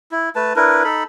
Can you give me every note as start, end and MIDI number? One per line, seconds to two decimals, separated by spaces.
0.11 0.29 64
0.36 0.53 57
0.36 0.53 71
0.36 0.53 81
0.56 0.83 62
0.56 0.83 64
0.56 0.83 70
0.56 0.83 71
0.84 1.04 63
0.84 1.04 69
0.84 1.04 83